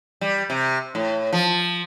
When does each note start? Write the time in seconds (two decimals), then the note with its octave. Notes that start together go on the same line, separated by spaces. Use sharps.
0.21 G3
0.50 C3
0.95 A2
1.33 F3